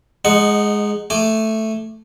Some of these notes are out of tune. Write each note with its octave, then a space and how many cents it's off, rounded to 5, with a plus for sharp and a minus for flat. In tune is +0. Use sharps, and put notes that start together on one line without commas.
G#3 +0 D#4 -20 F#5 +0
A3 +0 G#5 -5 D6 +10